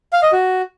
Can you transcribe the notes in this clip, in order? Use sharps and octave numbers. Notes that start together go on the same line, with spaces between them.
F5
D#5
F#4